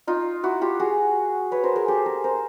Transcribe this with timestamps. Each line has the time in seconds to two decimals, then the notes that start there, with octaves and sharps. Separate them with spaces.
0.07 D#4 F4
0.44 E4 F#4
0.61 F4 G4
0.80 F#4 G#4
1.52 B4 C#5
1.64 A#4 C5
1.76 G#4 A#4
1.88 G4 A4
2.06 G#4 A#4
2.24 A#4 C5